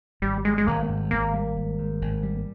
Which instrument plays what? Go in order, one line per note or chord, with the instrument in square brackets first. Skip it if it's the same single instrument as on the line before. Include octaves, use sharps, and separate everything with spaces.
[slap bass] G#1 [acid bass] G3
[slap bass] G3 [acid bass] G#3
[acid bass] G#3
[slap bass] G#1 [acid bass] A#3
[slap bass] G#2
[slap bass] G#1 [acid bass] A#3
[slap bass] G3
G#1
G#2
G#1
G3